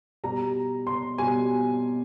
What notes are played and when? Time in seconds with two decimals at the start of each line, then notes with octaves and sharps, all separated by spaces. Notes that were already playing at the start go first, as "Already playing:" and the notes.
0.23 B2 G3 A#5
0.87 C6
1.18 B2 G3 G#5